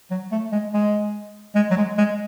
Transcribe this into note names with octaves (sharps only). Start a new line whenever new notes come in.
F#3
A3
G#3
G#3
G#3
F#3
G#3
G#3